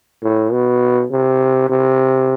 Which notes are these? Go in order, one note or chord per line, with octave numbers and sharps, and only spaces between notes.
A2
B2
C3
C3